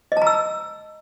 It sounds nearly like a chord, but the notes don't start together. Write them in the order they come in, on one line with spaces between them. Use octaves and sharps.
D#5 A5 A#5 E6